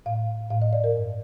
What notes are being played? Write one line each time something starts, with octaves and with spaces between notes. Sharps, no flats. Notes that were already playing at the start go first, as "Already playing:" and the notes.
A2 F5
A2 F5
D#5
D5
A#4
G2